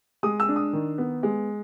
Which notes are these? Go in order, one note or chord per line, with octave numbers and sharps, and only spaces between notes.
G#3 D#6
E6
D4
D#6
D#3
B3
G#3